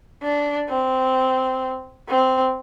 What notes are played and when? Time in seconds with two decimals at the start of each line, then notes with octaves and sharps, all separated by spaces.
0.23 D4
0.69 C4
2.08 C4